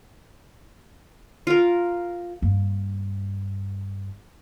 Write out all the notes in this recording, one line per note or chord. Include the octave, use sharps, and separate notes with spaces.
F4 A#4
G2 A#3